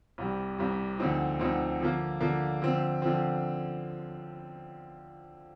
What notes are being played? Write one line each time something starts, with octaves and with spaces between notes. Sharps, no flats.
C2 C3 G3
C2 C3 G3
D2 D3 F3 C4 D#4
D2 D3 F3 C4 D#4
D3 F3 A#3
D3 F3 A#3
D3 F3 C4
D3 F3 C4